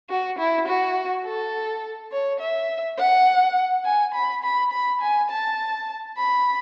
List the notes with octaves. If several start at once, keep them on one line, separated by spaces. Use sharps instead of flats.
F#4
E4
F#4
A4
C#5
E5
F#5
G#5
B5
B5
B5
G#5
A5
B5